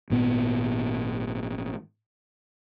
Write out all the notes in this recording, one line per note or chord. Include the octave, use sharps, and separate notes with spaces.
G#1 A#2 B3